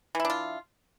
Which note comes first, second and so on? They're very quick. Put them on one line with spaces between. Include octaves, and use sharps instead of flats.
E3 E4 D4 F4